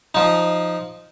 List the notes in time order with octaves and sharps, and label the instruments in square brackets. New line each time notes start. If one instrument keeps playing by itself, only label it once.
[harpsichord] F3 D#4